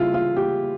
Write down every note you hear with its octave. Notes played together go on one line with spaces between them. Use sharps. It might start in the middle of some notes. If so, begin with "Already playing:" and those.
Already playing: C#3 G3 E4 F4
F4
G4